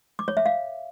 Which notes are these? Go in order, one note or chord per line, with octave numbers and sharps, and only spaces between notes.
D6
C#5
E5
F5